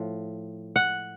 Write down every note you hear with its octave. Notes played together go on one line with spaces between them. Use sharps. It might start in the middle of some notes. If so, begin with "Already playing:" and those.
Already playing: A2 F3
F#5